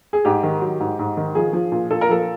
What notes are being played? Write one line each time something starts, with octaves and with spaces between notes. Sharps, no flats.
G#4
G#2 G4
D#3
F#3
G#2
G#2
D#3
F3 G#4
F3
A#2
A#2 A4
A#4
F3 A4